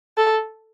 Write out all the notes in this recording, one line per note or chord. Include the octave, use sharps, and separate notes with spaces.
A4